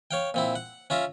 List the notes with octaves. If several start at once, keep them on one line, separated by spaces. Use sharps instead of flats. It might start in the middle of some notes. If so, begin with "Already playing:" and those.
C#5 F5 G5
A#2 C4 E4
F#5
C#4 F4 E5 A#5